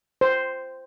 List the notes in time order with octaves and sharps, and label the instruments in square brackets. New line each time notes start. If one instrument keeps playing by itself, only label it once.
[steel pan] C5